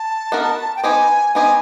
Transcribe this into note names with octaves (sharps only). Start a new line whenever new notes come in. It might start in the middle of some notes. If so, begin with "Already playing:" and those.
Already playing: A5
B3 D#4 F#4 A#4
G5
B3 D#4 G4 C5 D#5 G#5
B3 D#4 G4 C5 D#5 G#5